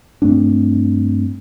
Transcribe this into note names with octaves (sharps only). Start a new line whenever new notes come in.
G2 A3 C4 D4